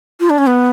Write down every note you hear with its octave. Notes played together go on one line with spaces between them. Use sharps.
F4
D4
C#4
B3